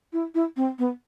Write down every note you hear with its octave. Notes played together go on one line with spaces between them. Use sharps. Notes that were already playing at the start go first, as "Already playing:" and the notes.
E4
E4
C4
B3